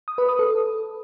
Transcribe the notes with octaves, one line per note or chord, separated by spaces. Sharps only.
D#6
B4
D#6
A4